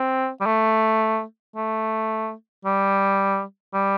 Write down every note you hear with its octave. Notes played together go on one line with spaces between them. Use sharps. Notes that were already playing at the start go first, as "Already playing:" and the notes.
Already playing: C4
G3
A3
A3
G3
G3